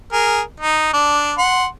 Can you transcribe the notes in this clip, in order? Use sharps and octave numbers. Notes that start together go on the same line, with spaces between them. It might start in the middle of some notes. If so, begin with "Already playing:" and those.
G#4 A#4
D#4
D4
F#5 C6